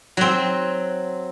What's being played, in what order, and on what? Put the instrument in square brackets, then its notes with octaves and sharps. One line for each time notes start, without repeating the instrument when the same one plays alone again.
[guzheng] F#3 C4